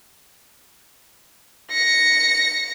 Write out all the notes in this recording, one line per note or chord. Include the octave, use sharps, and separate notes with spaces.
A#6 C#7